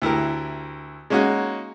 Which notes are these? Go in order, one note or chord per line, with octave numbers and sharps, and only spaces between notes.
D2 E4 G4 A#4
G#3 A#3 C#4 D#4 F#4